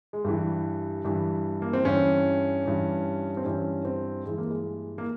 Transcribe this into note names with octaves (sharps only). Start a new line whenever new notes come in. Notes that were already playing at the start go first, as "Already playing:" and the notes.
G#3
G2 E3 G3
G2 E3
A#3
C4
G2 E3 C#4
G2 E3
C4
G2 E3 C#4
C4
G2 E3 G#3
A#3
G#3
A#3